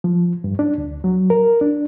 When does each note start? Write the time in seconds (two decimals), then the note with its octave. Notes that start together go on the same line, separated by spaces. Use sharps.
0.04 F3
0.44 G2
0.59 D4
0.78 D2
1.04 F#3
1.30 A#4
1.61 D4